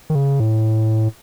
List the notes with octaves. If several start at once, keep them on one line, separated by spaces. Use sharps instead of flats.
D#3
C#3
A2